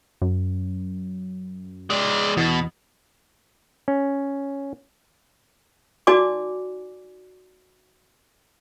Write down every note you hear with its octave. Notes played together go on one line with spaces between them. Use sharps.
F#2
G#3 D5
E2 B2
C#4
D#4 F#4 D5 G#5 D6